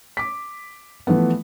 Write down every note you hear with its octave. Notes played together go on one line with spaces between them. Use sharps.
D6 B6
E3 F3 A3 B3